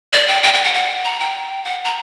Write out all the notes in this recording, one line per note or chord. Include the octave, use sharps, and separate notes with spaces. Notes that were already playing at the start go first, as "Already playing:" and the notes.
D5
G5
G5
G5
F#5
F#5
A#5
G5
F#5
A#5